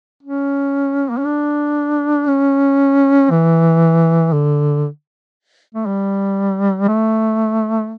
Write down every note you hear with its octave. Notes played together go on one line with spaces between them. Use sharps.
C#4
A#3
C#4
D4
C#4
E3
D3
A3
G3
A3